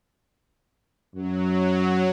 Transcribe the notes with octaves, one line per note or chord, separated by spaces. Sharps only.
F#2 F#3